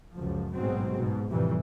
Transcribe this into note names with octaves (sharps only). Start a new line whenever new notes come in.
C#2 F#2 F3
A1 G#2 B2 F#3 G#3 C4
G#2 B2
F2 A2 C3 E3 G3